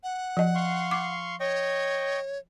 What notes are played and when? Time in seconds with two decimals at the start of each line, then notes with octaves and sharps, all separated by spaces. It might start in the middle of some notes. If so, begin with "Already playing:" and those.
0.03 F#5
0.37 F3 D#5
0.55 F5 C6 C#6
0.91 D6
1.40 C#5 D#5 G5 C#6